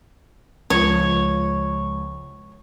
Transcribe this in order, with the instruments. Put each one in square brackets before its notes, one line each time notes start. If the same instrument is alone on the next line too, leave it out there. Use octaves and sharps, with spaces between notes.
[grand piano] C#2 F3 [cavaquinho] C#5